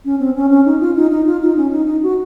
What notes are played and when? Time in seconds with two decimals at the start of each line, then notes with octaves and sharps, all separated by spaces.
0.05 C#4
0.20 C4
0.36 C#4
0.50 C#4
0.65 D#4
0.80 F4
0.96 D#4
1.11 D#4
1.26 F4
1.42 D#4
1.57 C#4
1.71 D#4
1.87 D#4
2.03 F#4